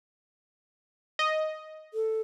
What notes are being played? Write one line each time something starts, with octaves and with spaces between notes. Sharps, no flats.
D#5
A4